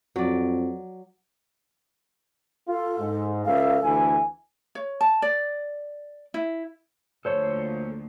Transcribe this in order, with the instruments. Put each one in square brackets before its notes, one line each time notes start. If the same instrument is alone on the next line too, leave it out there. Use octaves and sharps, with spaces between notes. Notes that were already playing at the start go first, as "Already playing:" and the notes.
[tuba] F2 [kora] F#3 D5
[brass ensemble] F4 [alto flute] A4
[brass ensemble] G#2
[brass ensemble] C#2 E5 F5 [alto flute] A4
[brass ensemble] D2 E3 G#5
[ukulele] C#5
A5
D5
E4
[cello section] D2 A#2 F3 [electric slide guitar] A4 C5 C#5